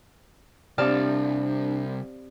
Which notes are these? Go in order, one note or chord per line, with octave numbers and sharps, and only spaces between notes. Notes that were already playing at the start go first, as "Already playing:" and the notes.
C2 C4 D4 G4 C5 D5 A5 F6